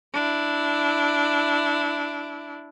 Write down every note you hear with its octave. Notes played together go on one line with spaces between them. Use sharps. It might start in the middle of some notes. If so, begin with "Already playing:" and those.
D4 E4